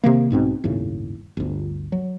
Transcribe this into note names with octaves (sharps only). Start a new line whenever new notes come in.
C3 D#3 A#3
B1 G#2 B2 C4
G1 D#2 A2 C#3
G1 D2
F#3